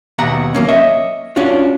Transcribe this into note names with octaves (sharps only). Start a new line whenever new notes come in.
D#2 B2 F#5 A#5
F#3 A#3 C#4
C#5 D#5 E5
C#4 D4 F4 F#4 C#5